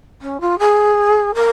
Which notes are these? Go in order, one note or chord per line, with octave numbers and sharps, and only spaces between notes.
C#4
F4
G#4
A#4